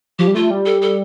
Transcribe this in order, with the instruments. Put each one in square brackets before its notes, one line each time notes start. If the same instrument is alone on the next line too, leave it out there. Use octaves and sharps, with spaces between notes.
[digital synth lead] F3 [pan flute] G4
[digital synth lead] G3
[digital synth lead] A3 [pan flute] F4
[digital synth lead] G3
[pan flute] A4
A4